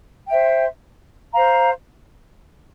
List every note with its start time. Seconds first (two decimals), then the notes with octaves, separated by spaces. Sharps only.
0.28 C5 E5 G5
1.33 C5 F5 A#5